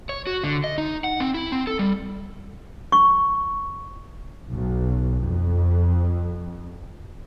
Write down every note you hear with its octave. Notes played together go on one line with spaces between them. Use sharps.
C#5
F#4
D3
D#5
D#4
F#5
C4
E4
C4
A4
G3
C#6
B1
F2